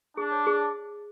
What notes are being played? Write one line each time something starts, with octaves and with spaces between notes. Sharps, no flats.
D4 G#4
C#5
G#4